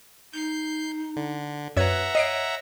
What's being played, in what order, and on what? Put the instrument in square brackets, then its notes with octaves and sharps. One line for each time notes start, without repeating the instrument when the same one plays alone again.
[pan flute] D#4 [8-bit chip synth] G6 C7
[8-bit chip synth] D3
[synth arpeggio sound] F#2 C#5 G#6 [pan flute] B4 [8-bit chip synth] E5 F#5 A#5
[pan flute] C#5 [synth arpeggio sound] D#5 C7 D7